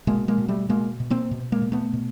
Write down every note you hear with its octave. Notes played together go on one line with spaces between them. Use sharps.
B2 G#3 A#3
G#3 A#3
B2
G3 A3
B2 G#3 A#3
B2
A#3 C4
B2
G#3 A#3
B2
A3 B3
B2